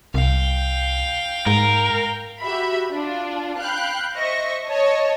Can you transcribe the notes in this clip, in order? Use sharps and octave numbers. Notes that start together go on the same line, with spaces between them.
C2 F5 G5
G#2 A#4
F#4 G4 E5 B5
D4 F4
F5 G5 B5 F#6 G6
C5 D#5 E5 C#6 A#6
C#5 D#5 A5